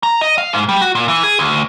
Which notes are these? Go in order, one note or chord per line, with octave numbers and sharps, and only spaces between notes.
A#5
D#5
F5
G#2
G3
F#4
A#2
E3
G#4
D2